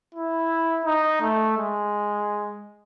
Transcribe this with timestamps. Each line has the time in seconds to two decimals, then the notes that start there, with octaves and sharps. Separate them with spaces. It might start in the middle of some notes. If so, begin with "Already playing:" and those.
0.14 E4
0.85 D#4
1.21 A3
1.57 G#3